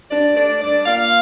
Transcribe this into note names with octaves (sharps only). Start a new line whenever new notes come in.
G2 D4 D5
A3 D4 D5
G2 D4 D5
A#3 F4 F5